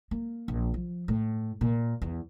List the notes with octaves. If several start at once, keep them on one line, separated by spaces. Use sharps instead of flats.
A#3
A#1
F3
A2
A#2
E2